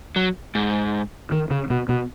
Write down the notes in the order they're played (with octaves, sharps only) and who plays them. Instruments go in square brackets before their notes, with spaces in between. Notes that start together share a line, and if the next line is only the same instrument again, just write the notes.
[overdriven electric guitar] F#3
G#2
[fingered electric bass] D#3
C#3
B2
B2